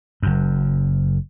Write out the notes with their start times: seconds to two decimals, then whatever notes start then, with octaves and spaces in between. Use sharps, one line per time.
0.23 F#1 F#2